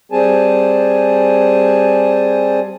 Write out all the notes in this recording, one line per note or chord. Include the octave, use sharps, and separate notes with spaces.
G3 C4 G#4 G#5 A5